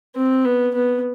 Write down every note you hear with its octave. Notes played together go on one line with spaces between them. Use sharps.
C4
B3
B3